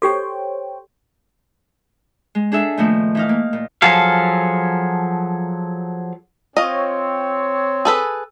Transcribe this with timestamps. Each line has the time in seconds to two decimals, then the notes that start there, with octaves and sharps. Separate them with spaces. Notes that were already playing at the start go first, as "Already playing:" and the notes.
0.02 G4 A4 C5 C#5 G5
2.35 G#3
2.52 D4 G#4 A4 E5
2.77 A#2 D#3 F3 A3 B3
3.15 E3 D#4 F5
3.29 A#3
3.53 A#2
3.82 F3 F#3 G#4 A4 F5
6.57 C4 F4 C#5 D#5
7.85 G#4 A4 B4